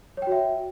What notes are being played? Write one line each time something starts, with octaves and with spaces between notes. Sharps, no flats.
F#4 C#5 E5 G5